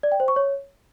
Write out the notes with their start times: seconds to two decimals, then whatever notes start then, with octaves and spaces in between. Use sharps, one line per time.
0.03 D5
0.12 G5
0.20 C5
0.28 C#6
0.36 C#5